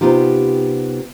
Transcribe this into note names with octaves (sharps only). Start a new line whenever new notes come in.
C3 E3 B3 D#4 F4 G4